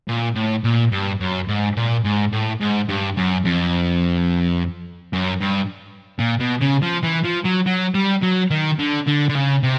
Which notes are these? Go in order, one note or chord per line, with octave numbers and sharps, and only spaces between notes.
A#2
A2
A#2
G2
F#2
G#2
A#2
G#2
A2
G#2
G2
F#2
F2
F#2
G2
A#2
B2
C#3
F3
E3
F3
F#3
F#3
G3
F#3
D#3
D3
D3
D3
C#3
C3